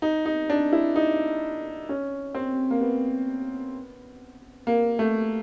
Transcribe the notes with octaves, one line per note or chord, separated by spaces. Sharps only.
D#4
D#4
D4
E4
D#4
C#4
C4
A#3
B3
A#3
A3